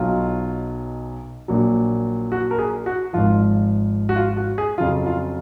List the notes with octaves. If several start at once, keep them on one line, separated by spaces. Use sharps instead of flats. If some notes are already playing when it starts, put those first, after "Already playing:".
Already playing: B1 B2 F#3 F4
A#1 A#2 F#3
F#4
A#4
G#4
F#4
G#1 G#2 F3 F4
F#4
F4
F#4
G#4
F2 C#3 F#3 F4
F4